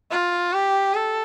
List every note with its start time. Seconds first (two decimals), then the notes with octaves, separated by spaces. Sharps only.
0.11 F4
0.53 G4
0.94 A4